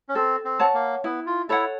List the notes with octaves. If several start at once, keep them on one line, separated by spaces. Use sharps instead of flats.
C#4
C4 A4
C4
C#5 F#5 A5
A#3
B3 E4
F4
E4 A4 C#5 F#5